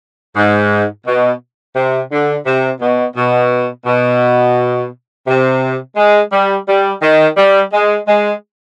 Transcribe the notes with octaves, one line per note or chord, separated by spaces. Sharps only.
G#2
B2
C3
D3
C3
B2
B2
B2
C3
G#3
G3
G3
D#3
G3
G#3
G#3